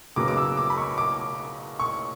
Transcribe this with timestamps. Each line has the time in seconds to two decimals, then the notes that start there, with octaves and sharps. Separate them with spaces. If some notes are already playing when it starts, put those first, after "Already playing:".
0.16 C#3 F#3 B3 D6
0.28 D6
0.37 E6
0.57 D6
0.70 B5
0.78 C#6
0.98 D6
1.80 C#6